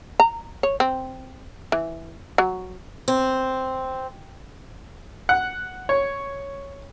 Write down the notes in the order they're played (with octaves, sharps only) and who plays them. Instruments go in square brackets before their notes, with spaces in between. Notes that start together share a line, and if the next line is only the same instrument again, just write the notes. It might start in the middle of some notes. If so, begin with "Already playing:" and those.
[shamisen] A#5
C#5
C4
E3
F#3
[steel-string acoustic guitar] C4
[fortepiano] F#5
C#5